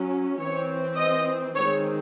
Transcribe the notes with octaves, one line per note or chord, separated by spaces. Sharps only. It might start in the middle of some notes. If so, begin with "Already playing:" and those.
Already playing: F#3 C#4
E3 C4 C#5
D#5
D#3 G#3 C4 C#5